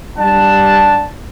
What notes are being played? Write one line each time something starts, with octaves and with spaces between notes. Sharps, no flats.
G3 D4 F#5 A5